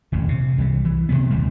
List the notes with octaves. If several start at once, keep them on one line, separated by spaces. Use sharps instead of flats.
D#1 A1 F2
C3
C2 E3 G3
E3
C3 D#3 E3 B3
D#1 A1 D#2 G3